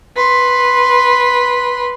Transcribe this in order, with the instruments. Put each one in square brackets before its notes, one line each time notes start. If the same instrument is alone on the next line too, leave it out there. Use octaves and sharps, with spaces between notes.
[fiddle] B4 C6